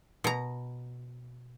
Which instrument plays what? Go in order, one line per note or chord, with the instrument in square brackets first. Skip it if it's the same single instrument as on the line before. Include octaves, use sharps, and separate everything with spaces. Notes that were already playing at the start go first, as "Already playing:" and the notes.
[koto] B2 A#5